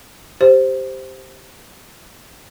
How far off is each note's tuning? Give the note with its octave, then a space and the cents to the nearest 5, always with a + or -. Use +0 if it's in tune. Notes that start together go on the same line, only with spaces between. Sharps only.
G4 +0 C5 +0